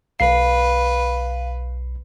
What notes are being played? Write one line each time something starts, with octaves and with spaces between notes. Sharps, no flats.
B1 B4 F5 C7